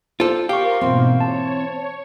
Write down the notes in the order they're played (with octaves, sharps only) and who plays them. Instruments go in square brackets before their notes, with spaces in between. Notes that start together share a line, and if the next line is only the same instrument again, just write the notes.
[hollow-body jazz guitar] F4 A4 [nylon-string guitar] C5 D5
[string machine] F4 A#4 C6 [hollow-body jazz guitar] G4 [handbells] F5 C#6
[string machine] G#2 B2 A#3 [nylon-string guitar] E3 C4
[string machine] C#5 [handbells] A5